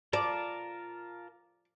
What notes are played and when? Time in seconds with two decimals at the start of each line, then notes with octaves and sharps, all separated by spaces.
0.13 F4 A#4 D5 A5